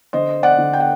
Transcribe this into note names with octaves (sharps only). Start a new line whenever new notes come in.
D3 C5 D#5
D5 F#5
D3
G5
F#5